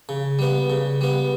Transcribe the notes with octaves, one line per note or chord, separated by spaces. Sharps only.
C#3
G3 B3
C#3
G3 B3